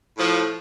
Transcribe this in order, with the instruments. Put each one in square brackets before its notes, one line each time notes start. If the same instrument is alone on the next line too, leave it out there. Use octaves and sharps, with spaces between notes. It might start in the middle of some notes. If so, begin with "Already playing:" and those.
[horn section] A2 F3